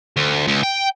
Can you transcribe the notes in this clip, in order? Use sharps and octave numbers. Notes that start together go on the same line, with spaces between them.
D2
C#2
G5